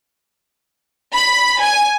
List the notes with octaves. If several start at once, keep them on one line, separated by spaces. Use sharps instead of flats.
B5
G#5